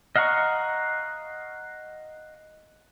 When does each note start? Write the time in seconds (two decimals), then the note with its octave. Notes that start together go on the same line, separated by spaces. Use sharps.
0.16 D#5 F5 F#5 A#5 C#6